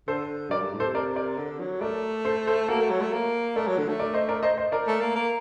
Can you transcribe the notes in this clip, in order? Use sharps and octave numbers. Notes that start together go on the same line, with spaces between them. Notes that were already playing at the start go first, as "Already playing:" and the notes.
D3 A4 C5
F#2 A#4 D5
G2
A2
A4 C5
C3
A#4 D5
A#4 D5
D3
F#3
A3 A#4 D5
A4 C5
A4 C5
A#3 F#4 A4
A3
F#3
A3
A#3
A3 A#4 D5
F#3
D3
A3
A#4 D5
C5 D#5
A#4 D5
C5 D#5
C5 D#5
A#4 D5
A3
A#3
A#3